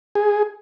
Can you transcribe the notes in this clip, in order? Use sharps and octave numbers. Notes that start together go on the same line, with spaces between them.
G#4